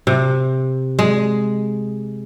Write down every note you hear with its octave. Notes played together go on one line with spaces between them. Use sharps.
C3
G#3